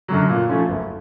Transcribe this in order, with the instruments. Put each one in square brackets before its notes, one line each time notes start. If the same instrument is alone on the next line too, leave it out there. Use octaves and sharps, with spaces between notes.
[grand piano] F#2 D3 F#3
A#2
F3 A3 C#4 F4
F#1